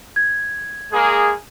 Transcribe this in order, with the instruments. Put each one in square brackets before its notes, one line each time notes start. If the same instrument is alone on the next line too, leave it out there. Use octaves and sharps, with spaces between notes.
[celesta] G#6
[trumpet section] G#3 A#3 G#4